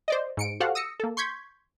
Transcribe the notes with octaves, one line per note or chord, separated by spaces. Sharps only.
C5 D5 D#5
G#2 C#7 D7
F#4 G4 A4 C5 F5 F#5
D#6 E6 A#6 C#7
A#3 A4
C6 C#6 G6 G#6 B6